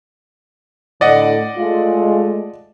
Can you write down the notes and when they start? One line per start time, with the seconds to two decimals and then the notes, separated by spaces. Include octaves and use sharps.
1.01 A2 D3 D5 D#5 F#5
1.57 G#3 A3 F4